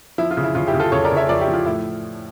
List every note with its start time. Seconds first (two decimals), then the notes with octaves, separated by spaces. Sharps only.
0.18 F3 E4
0.31 F4
0.37 C#3
0.43 E4
0.55 C#3 F4
0.67 E4 G4
0.74 C#3
0.80 F4 A4
0.92 C#3 A4 C#5
1.04 A#4 D5
1.11 C#3
1.16 C#5 E5
1.29 F3 A#4 D5
1.41 E4 G4
1.48 F3
1.54 F4
1.66 A2 E4